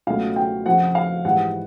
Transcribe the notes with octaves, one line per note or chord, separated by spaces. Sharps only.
C#2 B2 F#3 A3 C#4 F5
G5
F2 C#3 F3 F#5
F5
G#2 E3 G3 F#5